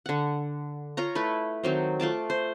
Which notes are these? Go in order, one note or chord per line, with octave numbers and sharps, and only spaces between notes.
D3 F#5
F4 C#5 A#5
A3 E4 B4
D#3 F#3 C4
A3 F4 A5 D6
C5